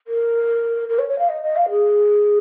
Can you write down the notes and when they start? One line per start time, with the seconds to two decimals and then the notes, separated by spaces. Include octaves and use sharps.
0.07 A#4
0.88 A#4
0.98 C#5
1.08 C#5
1.18 F5
1.28 D#5
1.42 D#5
1.55 F5
1.69 G#4